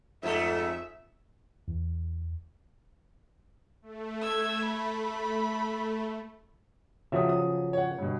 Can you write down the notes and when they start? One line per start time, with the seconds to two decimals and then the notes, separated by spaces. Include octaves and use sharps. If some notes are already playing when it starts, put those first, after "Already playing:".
0.23 F2 G#2 A3 E5
1.68 E2
3.82 A3
4.22 E6 G#6
4.66 B5
7.12 C#3 F3 F#3 E5 D#6
7.29 D#6
7.73 C#5 F#5
7.98 G2 B2